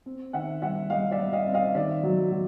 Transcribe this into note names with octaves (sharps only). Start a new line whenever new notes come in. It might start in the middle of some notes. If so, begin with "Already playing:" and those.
C4
D#3 E5 F#5
G3 E5 F#5
G3 D#5 F5
D5 E5
G3
D#5 F5
C4
D#5 F5
D#3 D5 E5
F#3
F#3